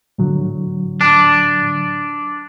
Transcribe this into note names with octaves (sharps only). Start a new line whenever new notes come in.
A2 D3 F#3
D4